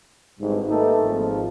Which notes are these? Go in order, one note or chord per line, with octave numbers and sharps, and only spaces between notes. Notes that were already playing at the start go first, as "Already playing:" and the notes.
G#1 G2
A3 A#3 D#4 G4 A4 B4
G#1 G#2 F3